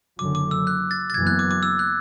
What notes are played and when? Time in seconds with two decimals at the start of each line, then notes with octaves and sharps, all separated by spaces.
0.19 F#1 F#2 D3 F#3 D6
0.35 D6
0.51 E6
0.67 F#6
0.91 A6
1.10 A6
1.14 F#1 F#2 E3 B3 G#6
1.27 F#6
1.39 D6
1.51 D6
1.63 E6
1.79 F#6